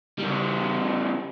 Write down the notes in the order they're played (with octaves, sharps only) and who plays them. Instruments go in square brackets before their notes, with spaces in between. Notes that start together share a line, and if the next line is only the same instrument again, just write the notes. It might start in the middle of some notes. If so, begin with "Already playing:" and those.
[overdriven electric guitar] C#3 G3